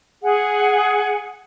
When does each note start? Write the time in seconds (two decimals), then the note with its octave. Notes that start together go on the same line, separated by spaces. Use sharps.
0.22 G#4 F#5